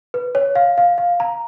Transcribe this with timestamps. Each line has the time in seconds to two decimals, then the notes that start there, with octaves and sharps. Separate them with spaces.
0.14 B4
0.35 C#5
0.55 F5
0.78 F5
0.98 F5
1.20 A#5